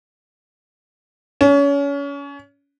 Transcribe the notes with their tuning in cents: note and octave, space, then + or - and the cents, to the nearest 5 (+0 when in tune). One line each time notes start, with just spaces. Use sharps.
C#4 +30